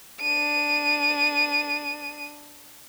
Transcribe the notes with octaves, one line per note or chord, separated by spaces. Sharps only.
D4 D#7